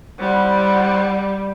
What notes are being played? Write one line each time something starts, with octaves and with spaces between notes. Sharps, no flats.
G3 C4 E4 F#5